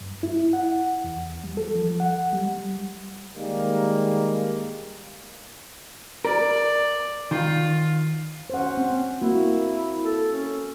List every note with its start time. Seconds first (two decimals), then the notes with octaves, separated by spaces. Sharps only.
0.01 G2
0.23 E4
0.53 F#5
1.04 E2
1.44 G3
1.57 A4
1.75 F3
2.00 F#5
2.33 G3
3.36 D#3 G3 G#3 A#3
6.25 A#4 D5
7.31 D#3 F4
8.50 C#4 C5 F#5
8.77 C4
9.21 A#3 E4 F#4
10.05 A4
10.33 C#4